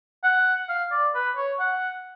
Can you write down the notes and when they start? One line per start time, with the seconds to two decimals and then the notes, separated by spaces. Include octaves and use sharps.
0.24 F#5
0.69 F5
0.92 D5
1.15 B4
1.37 C#5
1.60 F#5